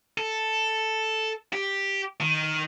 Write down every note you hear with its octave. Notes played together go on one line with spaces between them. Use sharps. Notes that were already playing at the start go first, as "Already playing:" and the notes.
A4
G4
D#3